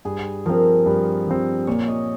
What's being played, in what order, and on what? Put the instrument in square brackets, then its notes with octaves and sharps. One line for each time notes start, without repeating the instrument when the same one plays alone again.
[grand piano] G2 [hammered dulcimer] G#4
[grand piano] F3 C4 [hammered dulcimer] A#4
[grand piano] G2
F3 C4
[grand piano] A#2 [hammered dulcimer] C#5
[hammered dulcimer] D#5